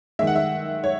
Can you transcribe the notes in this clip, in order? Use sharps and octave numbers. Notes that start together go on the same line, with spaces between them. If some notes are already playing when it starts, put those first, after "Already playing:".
D#3 G#3 E5
F#5
E5
C#5